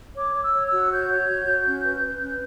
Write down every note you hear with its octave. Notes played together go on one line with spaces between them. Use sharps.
C#5 D6
C#5
E6
C#5
E6
F#4
C#5 G6
C#5
F#4
F#4
C#4
B4
B4
C#4